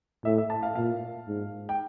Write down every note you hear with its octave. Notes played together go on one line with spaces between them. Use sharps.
A2 E5
E5
A5
F5
A#2 F5
G#2
G5